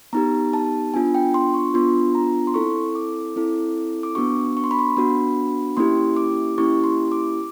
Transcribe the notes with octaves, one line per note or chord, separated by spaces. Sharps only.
B3 D#4 G4 A#5
A5
B3 D4 F4 G#5
G5
C6
C#6
B3 D4 F4 C6
A#5
C6
C4 E4 A4 C#6
D6
C4 E4 A4
D6
B3 D4 F#4 C#6
C#6
C6
B5
C6
B3 D4 F#4 B5
A#3 C#4 E4 G4 C6
D6
A#3 C#4 E4 G4 C#6
C6
D6